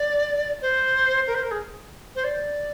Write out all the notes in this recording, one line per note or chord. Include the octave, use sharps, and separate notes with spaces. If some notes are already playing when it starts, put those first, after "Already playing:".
Already playing: D5
C5
A#4
C5
A#4
G#4
C5
D5